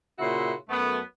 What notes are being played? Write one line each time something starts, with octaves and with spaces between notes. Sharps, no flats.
A#2 C#3 E4 F#4 E5 C6
F#2 A3 B3